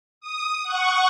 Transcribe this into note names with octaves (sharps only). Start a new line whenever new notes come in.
D#6
F#5 C#6